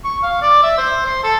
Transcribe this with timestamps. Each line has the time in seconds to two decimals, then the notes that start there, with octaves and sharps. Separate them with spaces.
0.05 C#6
0.23 F5
0.42 D5
0.63 E5
0.78 C5
1.06 C6
1.23 A4